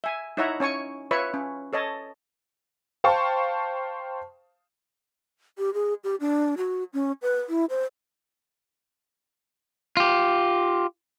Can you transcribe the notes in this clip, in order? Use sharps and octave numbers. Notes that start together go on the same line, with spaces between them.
E5 G#5
D#4 E4 C#5 E5 F#5 A#5
C#4 C#5 G#5 C#6
F4 B4 C#5 E5 B5 C#6
C#4
A4 C#5 D#5 A5
C5 F5 G5 A5 C#6
G4
G#4
G4
D4
F#4
C#4
B4
E4
C5
F4 G4